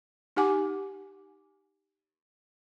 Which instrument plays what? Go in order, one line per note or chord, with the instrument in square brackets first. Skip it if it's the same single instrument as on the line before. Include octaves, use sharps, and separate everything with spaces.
[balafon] D#4 G4 F#5 G#5 D6